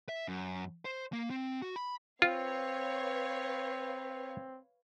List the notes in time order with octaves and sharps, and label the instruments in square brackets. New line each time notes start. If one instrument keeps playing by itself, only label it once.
[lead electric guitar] E5
F#2
C5
A#3
C4
F#4
B5
[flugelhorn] C4 [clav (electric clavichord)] F4 [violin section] B4 C#5 F5